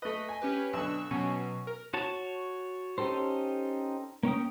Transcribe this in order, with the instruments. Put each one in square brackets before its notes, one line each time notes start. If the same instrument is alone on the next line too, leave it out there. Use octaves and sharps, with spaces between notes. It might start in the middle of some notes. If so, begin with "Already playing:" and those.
[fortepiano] A3 B4 [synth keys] D#5 B6
[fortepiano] G#5
[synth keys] C#4 G4 B4
[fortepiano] B1 D3 [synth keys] C#6 E6 F#6
[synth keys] B2 F#3 [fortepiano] C#4
[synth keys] A#4
[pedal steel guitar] F#4 C#5 A5
C#4 D#4 G4 A4 C5
A#3 C#4 G5 D#6